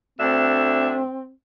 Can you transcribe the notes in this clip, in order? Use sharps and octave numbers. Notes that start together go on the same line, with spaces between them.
D2 C4 D4 E5